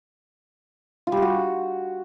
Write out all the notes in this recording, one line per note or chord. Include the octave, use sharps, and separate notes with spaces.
F4
G3
G4
F#4